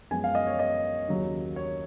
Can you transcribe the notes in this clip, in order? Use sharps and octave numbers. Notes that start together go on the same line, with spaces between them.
F#2 F3 G#3 B3 G#5
F5
D#5
C#5
D#5
D#2 C#3 F#3
C#5